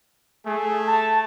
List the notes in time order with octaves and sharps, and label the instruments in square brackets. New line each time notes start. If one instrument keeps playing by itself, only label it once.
[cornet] A3 [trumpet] G#4
[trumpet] A5